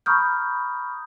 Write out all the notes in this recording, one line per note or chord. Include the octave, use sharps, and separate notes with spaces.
A#5 B5 C#6 D#6 F6 G6